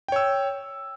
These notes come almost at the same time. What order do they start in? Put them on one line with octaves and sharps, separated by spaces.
G5 C#5 E6